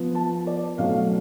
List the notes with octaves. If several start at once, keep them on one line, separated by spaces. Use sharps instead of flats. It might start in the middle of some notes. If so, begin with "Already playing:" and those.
Already playing: F3 B3
A5
D5
B2 F#3 A3 C#4 F5